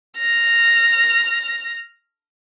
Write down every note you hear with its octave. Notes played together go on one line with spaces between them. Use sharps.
F6 A#6